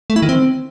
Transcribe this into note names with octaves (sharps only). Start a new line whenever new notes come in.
A3
E4
D#3
C4